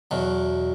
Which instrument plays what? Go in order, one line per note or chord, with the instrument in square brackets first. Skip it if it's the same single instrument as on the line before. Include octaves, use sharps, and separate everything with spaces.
[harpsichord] E2 B2 F#3